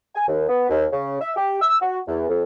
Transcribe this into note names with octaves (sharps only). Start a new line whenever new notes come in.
G#5
D#2
B3
D#2
C#3
E5
G4
E6
F#4
E2
F2